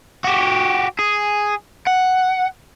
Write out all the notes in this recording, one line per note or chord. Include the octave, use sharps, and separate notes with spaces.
F#4 G4
G#4
F#5